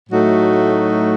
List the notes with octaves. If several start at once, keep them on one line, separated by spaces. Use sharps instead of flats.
A2 F#3 A3 D#4 F#4